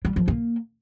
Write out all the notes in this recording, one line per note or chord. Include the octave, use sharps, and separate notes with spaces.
G3
F3
A#3